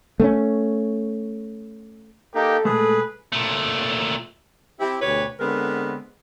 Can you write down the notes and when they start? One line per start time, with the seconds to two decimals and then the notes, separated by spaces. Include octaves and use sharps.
0.20 A3 B3 C#4
2.35 A#3 D#4 G4 A4
2.65 A#2 G#3 A3 G#4 B4
3.32 A#2 A3
4.80 C4 E4 G4
5.02 D2 B2 G4 B4 C#5
5.40 D3 G#3 B3 C4 A#4 B4